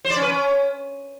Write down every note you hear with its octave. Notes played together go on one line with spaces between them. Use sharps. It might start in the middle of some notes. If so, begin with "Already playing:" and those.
C5
D5
C#4
B4
C#4